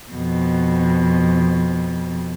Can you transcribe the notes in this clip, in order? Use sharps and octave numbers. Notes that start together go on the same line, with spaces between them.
F2 B2